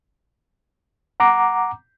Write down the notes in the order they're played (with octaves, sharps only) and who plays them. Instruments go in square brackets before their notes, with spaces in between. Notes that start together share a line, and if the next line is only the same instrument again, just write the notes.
[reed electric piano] F#5 A#5 D6